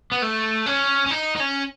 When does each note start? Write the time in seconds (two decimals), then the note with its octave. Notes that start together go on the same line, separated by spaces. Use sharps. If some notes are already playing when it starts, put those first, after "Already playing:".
0.12 B3
0.22 A3
0.66 C#4
1.06 C#4
1.11 D#4
1.36 D#4
1.40 C#4